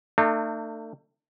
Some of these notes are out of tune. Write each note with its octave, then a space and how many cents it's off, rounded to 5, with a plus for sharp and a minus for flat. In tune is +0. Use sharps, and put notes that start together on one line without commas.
A3 +40 D#4 -45